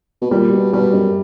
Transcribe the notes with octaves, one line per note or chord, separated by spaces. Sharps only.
B2
A#2 G3
B2
B2 G3
F#2